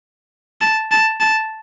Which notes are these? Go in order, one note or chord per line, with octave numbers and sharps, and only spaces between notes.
A5
A5
A5